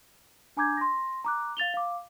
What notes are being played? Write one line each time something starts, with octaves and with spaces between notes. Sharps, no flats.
D4 G#5 A#5 D6 G6 G#6
C6 A#6
A#5 D6 F#6
F5 A6 F7 G7
F5 D6